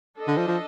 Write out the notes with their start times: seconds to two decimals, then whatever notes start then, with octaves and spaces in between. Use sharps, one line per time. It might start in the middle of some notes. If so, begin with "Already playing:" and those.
0.18 D4 A4 D#5
0.27 D3
0.38 F3
0.48 F3